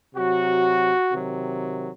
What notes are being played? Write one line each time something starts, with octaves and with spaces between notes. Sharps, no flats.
C3 F#3 F#4
C3 D#3 F#3